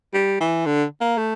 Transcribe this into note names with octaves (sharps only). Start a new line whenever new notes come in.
G3
E3
D3
A#3
A3